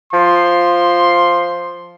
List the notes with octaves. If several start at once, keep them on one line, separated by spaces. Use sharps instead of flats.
F3 C6